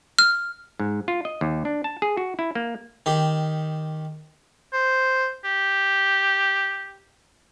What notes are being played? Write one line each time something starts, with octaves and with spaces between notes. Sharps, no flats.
F6
G#2
F4
D#5
D#2
D4
A5
G#4
F#4
E4
A#3
D#3 G4
C5
G4